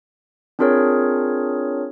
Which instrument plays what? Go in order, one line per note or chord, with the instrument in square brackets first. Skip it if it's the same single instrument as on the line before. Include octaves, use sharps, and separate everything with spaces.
[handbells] C4 D4 F4 G#4 A#4 C#5